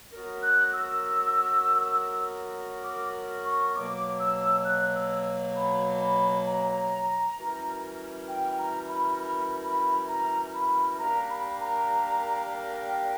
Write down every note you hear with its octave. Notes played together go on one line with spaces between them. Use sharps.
F#3 B3 F#4 A#4
F#6
E6
D6
C#6
B2 F#3 A#3 D6
E6
F#6
E6
B5
B5
A#5
E3 G3 C#4 F#4 A#4
G5
A#5
B5
B5
B5
A#5
B5
G3 A#3 D4 G4 A#4 A#5
B5
A#5
G5